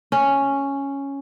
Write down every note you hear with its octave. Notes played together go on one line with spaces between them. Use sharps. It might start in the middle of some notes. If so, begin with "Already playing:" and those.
C#4